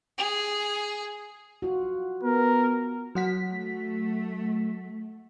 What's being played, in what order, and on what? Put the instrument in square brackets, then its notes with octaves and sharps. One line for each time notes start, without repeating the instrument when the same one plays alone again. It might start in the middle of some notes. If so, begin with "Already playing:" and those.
[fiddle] G#4
[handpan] F4 F#4
[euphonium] B3 [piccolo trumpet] A#4
[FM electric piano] F#3 F#5 B6
[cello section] A3